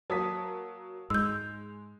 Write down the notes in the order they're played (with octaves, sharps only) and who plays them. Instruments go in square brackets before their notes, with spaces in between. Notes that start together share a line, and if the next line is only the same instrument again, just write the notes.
[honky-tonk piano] F#3 A#3 [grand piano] A5 D#6 B6
[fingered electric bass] G#2 [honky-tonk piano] G#3 [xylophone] E6 G6